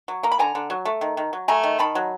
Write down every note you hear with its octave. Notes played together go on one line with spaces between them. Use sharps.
F#3
A#3 A#5
B5
D3 G#5 A#5
D3
F#3
A3
D#3
D#3
F#3
A3 G#5 A#5
D#3
D#3 A5 B5
F#3